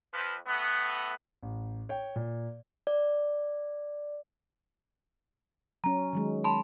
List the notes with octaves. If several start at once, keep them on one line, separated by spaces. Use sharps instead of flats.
F2 F3 B4
A2 A3 B3
A1
C#5 G5
A#2
D5
F#3 C#4 A#5
D#3 F#3 G#3
A5 B5 C6